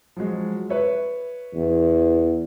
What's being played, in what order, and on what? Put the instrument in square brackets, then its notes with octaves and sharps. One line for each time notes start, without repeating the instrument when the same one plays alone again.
[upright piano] F3 F#3 G#3
B4 C#5 E5
[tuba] E2